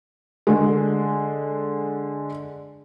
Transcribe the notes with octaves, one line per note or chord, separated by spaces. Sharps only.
D3 G#3